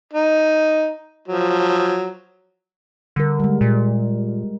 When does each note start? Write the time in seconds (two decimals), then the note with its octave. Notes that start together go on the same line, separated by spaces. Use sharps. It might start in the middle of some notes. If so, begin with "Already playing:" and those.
0.13 D#4
1.28 F3 F#3
3.16 D3 G3 A#4
3.40 G3 G#3
3.61 A#2